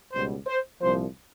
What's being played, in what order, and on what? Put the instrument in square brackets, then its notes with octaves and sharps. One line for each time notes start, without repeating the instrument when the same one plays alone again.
[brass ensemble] C#2 B2 G3 C5
C5
C2 A#2 F3 C5